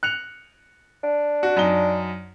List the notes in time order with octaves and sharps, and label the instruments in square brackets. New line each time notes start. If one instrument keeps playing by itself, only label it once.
[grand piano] F#6 C#7 F7
[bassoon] D4
[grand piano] F#4
F#2 D#4 G7